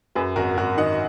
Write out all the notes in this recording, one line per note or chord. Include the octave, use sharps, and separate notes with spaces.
F#2 G#4 B4
G#1 F#4 A#4
G#1 F#4 A#4
D#3 D#5 F#5